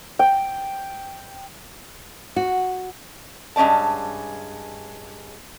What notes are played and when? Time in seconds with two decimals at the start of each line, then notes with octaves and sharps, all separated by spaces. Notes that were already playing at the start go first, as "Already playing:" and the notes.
0.19 G5
2.36 F#4
3.56 G2 G#3 C#4 D5 A5